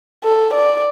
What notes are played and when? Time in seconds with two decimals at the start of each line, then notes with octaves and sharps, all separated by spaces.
0.24 A4
0.54 D5